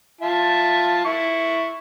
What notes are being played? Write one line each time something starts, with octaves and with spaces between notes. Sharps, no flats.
F4 E5 A5
E4 C#6